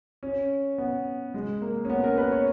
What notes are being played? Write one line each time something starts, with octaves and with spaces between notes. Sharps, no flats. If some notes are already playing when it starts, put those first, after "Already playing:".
C#4
B3
G#3
A#3
C#4
B3
A#4
B4
C#5